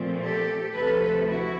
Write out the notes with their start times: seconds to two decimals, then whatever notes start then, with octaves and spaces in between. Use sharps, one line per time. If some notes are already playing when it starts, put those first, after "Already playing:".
Already playing: A#2 F3 A3 C4
0.24 G4 A4
0.76 D2 C3 F3 A4 B4
1.29 E4 F#4